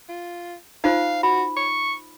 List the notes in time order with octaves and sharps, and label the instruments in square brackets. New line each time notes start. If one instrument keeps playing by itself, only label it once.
[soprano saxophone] F4
[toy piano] D#4 F4 C5 [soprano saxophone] F5
[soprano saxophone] F#4 [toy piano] B5
[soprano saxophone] C#6